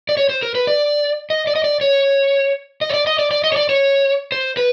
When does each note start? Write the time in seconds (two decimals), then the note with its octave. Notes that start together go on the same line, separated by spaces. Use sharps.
0.09 D5
0.17 C#5
0.29 C5
0.43 A#4
0.55 B4
0.67 D5
1.30 D#5
1.47 D5
1.56 D#5
1.64 D5
1.81 C#5
2.81 D#5
2.90 C#5
2.94 D5
3.07 D#5
3.19 D5
3.31 D5
3.44 D#5
3.52 C#5
3.56 D5
3.69 C#5
4.32 C5
4.57 B4